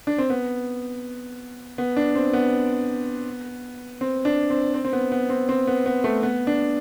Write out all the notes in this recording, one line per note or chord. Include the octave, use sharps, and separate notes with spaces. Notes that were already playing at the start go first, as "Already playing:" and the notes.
D4
C4
B3
B3
D4
C4
B3
C4
D4
C4
C4
C4
B3
B3
C4
C4
B3
B3
A3
B3
D4